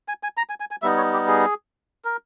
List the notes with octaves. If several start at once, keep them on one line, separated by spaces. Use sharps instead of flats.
G#5
G#5
A#5
G#5
G#5
G#5
G3 B3 D#4 E5
C#5
G4
G#4
A#4